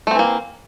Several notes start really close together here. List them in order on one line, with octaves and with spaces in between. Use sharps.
A3 C4 E3 A#3